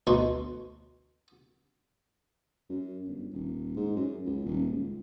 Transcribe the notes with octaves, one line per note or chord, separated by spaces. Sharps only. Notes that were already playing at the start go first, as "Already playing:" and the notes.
D2 B2 D#4 C6 C#6
F#2
G1
D#1
G#2
F#2
C#2
D#1
C#2